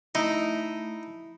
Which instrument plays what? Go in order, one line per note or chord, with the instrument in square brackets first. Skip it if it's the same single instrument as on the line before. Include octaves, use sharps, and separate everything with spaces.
[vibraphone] A3 [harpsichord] D#4 [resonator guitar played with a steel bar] E4